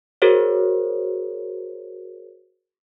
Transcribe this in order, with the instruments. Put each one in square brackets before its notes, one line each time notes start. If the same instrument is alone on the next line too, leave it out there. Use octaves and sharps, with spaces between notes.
[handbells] F#4 G#4 A#4 C5 C#5